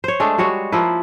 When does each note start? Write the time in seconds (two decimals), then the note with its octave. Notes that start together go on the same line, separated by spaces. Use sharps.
0.04 C5 C#5
0.20 G#3 A3 D4
0.38 G3 G#3 F#4 C#5
0.72 F3 A#3 E4 B4